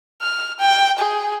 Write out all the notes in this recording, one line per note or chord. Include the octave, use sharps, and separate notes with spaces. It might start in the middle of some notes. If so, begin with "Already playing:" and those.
F6
G5
G#4